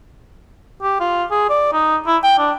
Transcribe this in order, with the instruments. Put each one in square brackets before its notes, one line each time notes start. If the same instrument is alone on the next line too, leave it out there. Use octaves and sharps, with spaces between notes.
[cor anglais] G4
F4
G#4
D5
D#4
E4
G5
D4